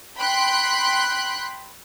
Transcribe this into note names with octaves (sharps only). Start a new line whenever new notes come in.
G5 B5 C6 F#6